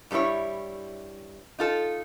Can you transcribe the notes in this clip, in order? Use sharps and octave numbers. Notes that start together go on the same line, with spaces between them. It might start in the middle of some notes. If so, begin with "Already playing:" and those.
G2 G3 C4 E4 C#5
D#4 F4 A4